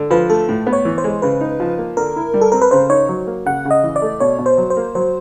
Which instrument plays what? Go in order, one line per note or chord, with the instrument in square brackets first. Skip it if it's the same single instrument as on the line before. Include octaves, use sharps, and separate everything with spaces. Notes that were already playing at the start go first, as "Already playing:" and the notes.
Already playing: [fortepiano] D3
[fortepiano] F3 [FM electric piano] B4
[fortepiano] A3 [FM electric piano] A4
[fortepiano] A2
B3
[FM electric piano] C#5
[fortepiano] E3
[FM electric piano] C5
[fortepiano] G#3
[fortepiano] C#3 [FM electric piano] B4
[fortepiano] D#4
F3
A#3
[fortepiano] D3 [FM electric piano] A#4
[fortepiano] E4
G3
[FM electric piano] A4
[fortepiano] C4 [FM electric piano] A#4
[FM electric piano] B4
[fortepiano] C#3 [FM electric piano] C5
[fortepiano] D#4 [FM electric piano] C#5
[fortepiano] F#3
A#3
[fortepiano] C#3 [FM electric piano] F#5
[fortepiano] C#3
[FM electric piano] D#5
[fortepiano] E3
[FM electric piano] D5
[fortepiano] A3
[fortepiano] B2 [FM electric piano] C#5
[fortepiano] B2
[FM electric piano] C5
[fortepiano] F#3
[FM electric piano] C5
[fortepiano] A#3
[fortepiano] F#3 [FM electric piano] C5